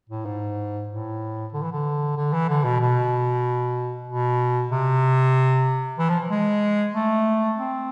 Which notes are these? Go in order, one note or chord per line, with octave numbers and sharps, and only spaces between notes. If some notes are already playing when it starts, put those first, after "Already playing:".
A2
G#2
A2
D3
E3
D3
D3
E3
D3
B2
B2
B2
C3
E3
F3
G#3
A3
C4